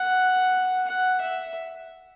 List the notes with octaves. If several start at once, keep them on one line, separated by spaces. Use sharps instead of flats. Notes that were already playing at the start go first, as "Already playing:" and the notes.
Already playing: F#5
F#5
E5